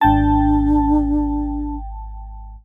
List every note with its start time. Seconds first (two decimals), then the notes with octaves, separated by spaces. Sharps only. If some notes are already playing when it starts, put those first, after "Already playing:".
0.01 G#1 D4 G5 A5